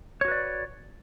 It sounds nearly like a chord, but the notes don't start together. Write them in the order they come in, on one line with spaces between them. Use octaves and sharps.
C#5 F#4 B4 D5